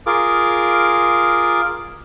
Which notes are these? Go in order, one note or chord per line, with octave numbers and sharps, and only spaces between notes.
F4 G#4 A#4 D6